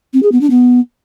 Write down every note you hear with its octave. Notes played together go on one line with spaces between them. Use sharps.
C4
G#4
B3
D4
B3